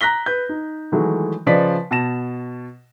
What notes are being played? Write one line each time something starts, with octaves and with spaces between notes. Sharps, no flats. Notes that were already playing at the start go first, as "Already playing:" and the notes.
A#5 F#6 A#6 B6 G7
B4 G6
D#4
D#3 E3 F#3 G#3 A3
C#3 F3 B4 D5 D#5 B6
B2 A5 A#6 E7